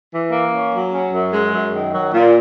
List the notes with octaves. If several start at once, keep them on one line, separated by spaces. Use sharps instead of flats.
E3
A#3
C#4
F#3
C#4
F#2
G#3
F#2
D#3
F#3
A#2